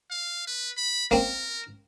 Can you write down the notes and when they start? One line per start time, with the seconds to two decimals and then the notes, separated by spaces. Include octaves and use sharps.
0.10 F5
0.47 B4
0.77 B5
1.11 A#3 C4 A#4